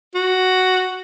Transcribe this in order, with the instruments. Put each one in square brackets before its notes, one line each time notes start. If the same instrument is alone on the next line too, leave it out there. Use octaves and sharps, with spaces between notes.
[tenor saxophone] F#4